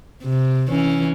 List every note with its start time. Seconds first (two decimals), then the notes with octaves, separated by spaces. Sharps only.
0.23 C3
0.69 E3 C#4